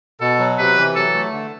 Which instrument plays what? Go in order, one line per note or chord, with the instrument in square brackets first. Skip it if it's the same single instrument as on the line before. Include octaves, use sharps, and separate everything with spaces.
[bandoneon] B2 [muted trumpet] A4
[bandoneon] F#3
[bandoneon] C3 [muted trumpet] B4
[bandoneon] E3
[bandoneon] F#3 [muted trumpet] A4
[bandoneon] A3
D3